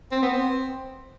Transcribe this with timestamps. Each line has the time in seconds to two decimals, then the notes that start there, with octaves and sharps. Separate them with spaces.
0.12 C4
0.22 B3
0.33 C4